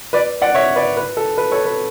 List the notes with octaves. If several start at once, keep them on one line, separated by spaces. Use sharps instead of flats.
B4 D5
D5 F#5
C#5 E5
B4 D5
B4
A4
B4
A4 C#5
B4